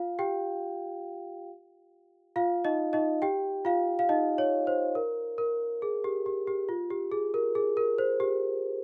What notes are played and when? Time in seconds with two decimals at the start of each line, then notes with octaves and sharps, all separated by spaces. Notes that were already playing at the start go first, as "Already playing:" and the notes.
Already playing: F4 F5
0.19 G4 G5
2.36 F4 F5
2.65 D#4 D#5
2.93 D#4 D#5
3.22 G4 G5
3.65 F4 F5
3.99 F5
4.09 D#4 D#5
4.38 C#5
4.67 C5
4.95 A#4
5.38 A#4
5.82 G#4
6.04 G4
6.26 G4
6.47 G4
6.69 F4
6.90 G4
7.12 G#4
7.34 A#4
7.55 G#4
7.77 A#4
7.98 C5
8.20 G4